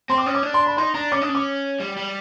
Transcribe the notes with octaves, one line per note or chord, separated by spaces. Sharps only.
C4 C6
D6
C#4 D#6
D6
D4
C6
B5
D#4 C6
D4 A#5
C#4 D6
D4 D#6
C#4
D6
G3
G3